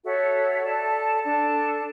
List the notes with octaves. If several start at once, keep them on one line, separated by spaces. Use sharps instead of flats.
F#4 A4 C#5 E5
A4 D5 A5
D4 A4 D5 A5